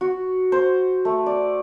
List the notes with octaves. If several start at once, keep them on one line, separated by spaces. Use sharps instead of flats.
F#4
C5
A3
D5